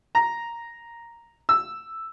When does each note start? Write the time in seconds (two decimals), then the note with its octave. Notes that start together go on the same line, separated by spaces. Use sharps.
0.15 A#5
1.49 E6